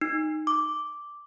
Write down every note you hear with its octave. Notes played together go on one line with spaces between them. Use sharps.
D#4
D6